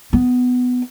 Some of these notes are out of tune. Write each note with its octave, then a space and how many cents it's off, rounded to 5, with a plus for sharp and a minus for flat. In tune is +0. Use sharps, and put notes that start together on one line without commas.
B3 +10